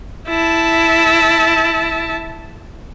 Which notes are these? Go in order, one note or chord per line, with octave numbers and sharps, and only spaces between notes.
E4 A5